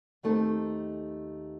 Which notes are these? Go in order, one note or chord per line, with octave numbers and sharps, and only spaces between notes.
D#2 D#3 A3 C4 D#4